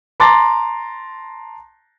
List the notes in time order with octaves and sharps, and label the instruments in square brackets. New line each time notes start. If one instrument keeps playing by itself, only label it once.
[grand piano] A5 A#5 C6 D6 A6